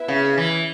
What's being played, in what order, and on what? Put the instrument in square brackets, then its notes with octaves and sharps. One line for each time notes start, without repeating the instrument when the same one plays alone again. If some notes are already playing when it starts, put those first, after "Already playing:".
Already playing: [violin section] B3 E4 B4 E5
[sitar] C#3
E3